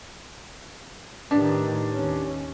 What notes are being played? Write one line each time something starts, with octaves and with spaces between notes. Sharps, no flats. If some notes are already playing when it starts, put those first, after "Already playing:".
A2 D#3 D4 G4 B4
D#2 C#4